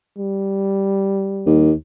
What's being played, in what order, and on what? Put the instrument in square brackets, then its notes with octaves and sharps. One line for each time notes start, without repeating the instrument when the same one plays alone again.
[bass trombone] G3
[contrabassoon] D#2